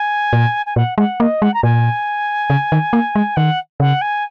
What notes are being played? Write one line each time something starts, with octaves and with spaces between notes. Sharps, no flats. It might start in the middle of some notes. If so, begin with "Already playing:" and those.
Already playing: G#5
A#2
G#5
A#2 F#5
G#3 F#5
A#3 D#5
G#3 F#5
A#5
A#2 G#5
C#3
D#3
A#3
G#3
D#3 F#5
C#3 F#5
G#5